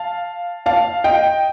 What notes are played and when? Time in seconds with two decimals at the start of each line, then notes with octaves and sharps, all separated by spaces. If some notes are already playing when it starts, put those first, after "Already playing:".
Already playing: F5 A5
0.66 F5 A5
1.04 D#5 G5